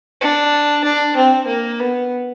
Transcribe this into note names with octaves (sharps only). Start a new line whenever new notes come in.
D4
D4
C4
A#3
B3